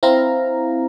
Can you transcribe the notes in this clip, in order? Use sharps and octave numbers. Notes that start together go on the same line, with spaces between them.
C4 E4 F5 A#5